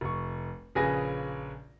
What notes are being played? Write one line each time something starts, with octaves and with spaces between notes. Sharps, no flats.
F1 C#6
A#1 C#3 G#4 B4 G#5 A#6